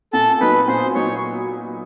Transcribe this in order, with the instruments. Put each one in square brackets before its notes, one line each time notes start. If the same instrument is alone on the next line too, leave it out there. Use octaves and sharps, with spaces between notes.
[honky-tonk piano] A#2 [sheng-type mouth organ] A4 A5
[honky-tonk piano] F#3 B3 D#4 [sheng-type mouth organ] B4 B5
[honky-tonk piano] A#2 [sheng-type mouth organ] C5 C6
[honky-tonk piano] F#3 B3 D#4 [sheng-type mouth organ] C#5 C#6
[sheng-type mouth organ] C#6